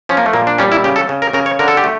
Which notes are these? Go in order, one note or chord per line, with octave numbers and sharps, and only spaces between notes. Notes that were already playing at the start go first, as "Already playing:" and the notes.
F3 C#4
A#3
A3
A#2 A#3
D4
G3 C#4
E4
C#3 G4
A4
C#3
A#4
C#3 A#4
C#5
D3 A#4
A4
G4
A3